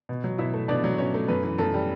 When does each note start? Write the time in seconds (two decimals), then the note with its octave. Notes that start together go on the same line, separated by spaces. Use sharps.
0.09 B2
0.24 F#3
0.38 B2 E4 E5
0.54 A3
0.68 B2 D4 D5
0.84 F#3
0.98 B2 C#4 C#5
1.14 A3
1.28 F#2 B3 B4
1.43 E3
1.58 F#2 A3 A4
1.74 G3